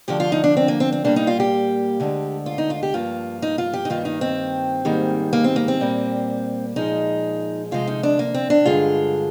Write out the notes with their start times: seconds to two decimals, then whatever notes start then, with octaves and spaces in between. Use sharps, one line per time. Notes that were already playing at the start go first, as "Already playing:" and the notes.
0.08 D2 D3 F3 G4
0.20 F4
0.32 D#4
0.44 D4
0.57 C4
0.68 A#3
0.80 C4
0.92 C4
1.04 A#2 G3 A#3 D4
1.16 D#4
1.27 F4
1.40 G4
2.00 D2 D3 G#3
2.46 F4
2.58 D#4
2.70 F4
2.83 G4
2.94 G2 F3 A#3 F4
3.42 D#4
3.58 F4
3.73 G4
3.85 D#4
3.90 G2 D#3 A#3 F4
4.05 D#4
4.21 C4
4.85 G#2 D#3 G3 A#3
5.33 A#3
5.44 C4
5.56 A#3
5.68 C4
5.80 A#2 G3 A#3
6.76 A#2 F3 G#3 D#4
7.71 D2 C3 F3 G#3 F4
7.87 D#4
8.03 D4
8.19 A#3
8.34 C4
8.50 D4
8.65 G2 D3 G#3 F4